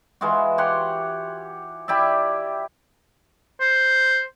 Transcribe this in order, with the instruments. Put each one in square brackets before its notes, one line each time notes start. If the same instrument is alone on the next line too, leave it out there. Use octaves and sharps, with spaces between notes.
[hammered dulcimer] E3 G#3 F4 F#4
G4 C#5 F#5 C6
E4 G4 D5 E5
[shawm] C5